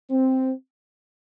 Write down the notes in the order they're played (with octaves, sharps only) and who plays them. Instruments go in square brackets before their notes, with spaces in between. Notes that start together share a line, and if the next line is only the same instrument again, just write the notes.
[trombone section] C4